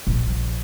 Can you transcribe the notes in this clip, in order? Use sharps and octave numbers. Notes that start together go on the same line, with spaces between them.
A#1